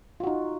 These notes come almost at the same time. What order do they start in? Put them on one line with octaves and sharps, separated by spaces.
F4 F#4 D#4